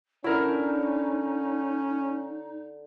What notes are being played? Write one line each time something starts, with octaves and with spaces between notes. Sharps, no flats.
D3 C#4 D#4 E4 A#4